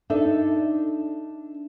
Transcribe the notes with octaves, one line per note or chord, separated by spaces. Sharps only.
D4 D#4 A4 E5